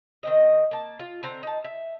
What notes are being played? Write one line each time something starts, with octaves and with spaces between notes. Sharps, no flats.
D#3 C4 D#5
A#3 A5
F4
D3 C4 A#5
D#4 A5
E5